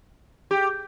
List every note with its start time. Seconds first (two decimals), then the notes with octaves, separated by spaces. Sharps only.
0.51 G4